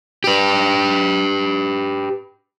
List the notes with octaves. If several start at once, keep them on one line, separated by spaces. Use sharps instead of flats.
G4 B4